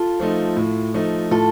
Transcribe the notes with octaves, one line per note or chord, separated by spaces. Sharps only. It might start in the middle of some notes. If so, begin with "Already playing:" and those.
Already playing: F4 A4
F3 A3 D#4
A2
F3 A3 D#4
A2 F4 A4